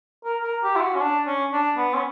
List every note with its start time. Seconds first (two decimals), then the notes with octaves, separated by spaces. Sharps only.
0.25 A#4
0.44 A#4
0.63 G4
0.76 E4
0.81 F#4
0.95 C#4
1.01 D4
1.27 C#4
1.53 D4
1.77 B3
1.95 C#4